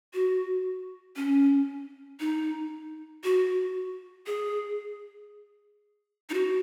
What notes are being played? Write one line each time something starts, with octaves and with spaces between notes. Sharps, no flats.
F#4
C#4
D#4
F#4
G#4
D#4
F#4